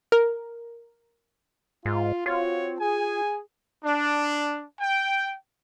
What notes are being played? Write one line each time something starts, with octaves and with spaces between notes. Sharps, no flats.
A#4
G#2 F4
C4 F4 F#4 C#5
G#4 G#5
D4
G5